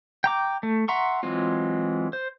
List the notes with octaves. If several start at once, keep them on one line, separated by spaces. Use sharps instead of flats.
G5 A#5 D6
A3
E5 F#5 A#5 C6 C#6
E3 F#3 G#3 C4 F4
C5